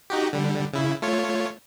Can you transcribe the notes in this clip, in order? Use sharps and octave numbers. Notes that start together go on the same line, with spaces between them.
D#4 F#4 G4
D3 G3
C#3 E4
A3 F4 C#5